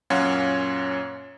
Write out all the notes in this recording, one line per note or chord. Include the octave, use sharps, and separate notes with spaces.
F#2 A#2 C#4 C#5 F5 F#5